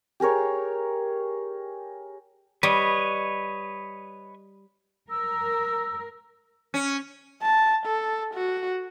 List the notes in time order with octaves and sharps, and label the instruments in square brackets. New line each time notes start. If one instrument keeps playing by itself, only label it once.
[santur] G4 G#4 A#4 C#5
[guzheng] G3 [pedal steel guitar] B4 C#5 D#5
[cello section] A#4 [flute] E6
[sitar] C#4
[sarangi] A5
A4
F#4